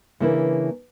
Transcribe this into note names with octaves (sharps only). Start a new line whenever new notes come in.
C#3 E3 A#3 D4 E4 B4